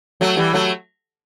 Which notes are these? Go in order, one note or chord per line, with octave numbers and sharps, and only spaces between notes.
F#3 A3
E3 G3
F#3 A3